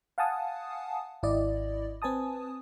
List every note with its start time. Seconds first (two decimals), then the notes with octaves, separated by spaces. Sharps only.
0.18 F5 F#5 G#5 A5 D#6
1.23 G#1 E4 D5 D#5
2.02 C4 B4 G#5 A5 D#6